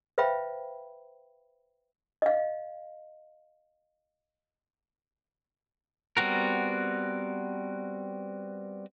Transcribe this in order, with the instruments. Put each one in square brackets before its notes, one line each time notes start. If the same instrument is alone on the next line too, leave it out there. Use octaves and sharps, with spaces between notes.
[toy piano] B4 C5 E5 F5 G5 B5
D#5 F5
[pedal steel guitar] G3 B3 C4 F#4 A#4